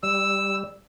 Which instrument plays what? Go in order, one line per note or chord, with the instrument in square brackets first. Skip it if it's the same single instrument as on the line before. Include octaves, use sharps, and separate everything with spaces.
[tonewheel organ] G3 [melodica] E6